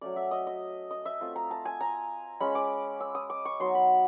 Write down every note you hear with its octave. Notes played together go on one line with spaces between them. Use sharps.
F#3 A3 C#4 D5
E5
D#5
D#5
D#5
E5
A3 C4 F4
A#5
A5
G#5
A#5
G#3 C#4 F4 B5
D6
E6
D#6
D6
C#6
F#3 B3 D#4 C6
B5